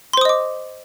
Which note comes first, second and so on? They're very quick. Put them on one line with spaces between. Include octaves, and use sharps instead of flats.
C6 C5 D#6 D#5 D6